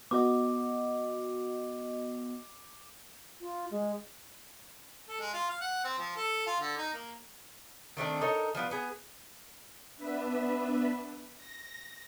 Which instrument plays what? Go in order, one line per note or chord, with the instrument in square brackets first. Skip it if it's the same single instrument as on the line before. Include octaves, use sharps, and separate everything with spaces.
[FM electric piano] B3 F#4 D#5 [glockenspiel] D6
[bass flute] F4
G#3
[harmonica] A4
G#3
F4
F5
F#5
C4
F3
A4
F4
D3
D#4
A#3
[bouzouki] D#3 A3 C4 D4
D#4 A4 A#4 C#5
F3 G3 B3 F4
B3 G#4
[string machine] B3 D4 B4 E5
A#6